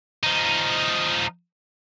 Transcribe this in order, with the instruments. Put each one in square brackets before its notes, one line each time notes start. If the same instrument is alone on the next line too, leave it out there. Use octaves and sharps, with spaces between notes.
[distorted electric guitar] F3 D#4